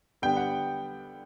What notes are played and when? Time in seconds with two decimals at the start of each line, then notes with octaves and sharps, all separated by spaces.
0.22 D3 G3 B3 G5
0.37 F#5